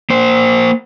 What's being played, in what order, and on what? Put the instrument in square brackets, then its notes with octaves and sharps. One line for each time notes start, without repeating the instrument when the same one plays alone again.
[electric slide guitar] A#3 C5